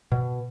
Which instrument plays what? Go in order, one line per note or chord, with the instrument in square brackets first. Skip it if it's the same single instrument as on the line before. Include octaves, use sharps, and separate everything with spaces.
[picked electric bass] B2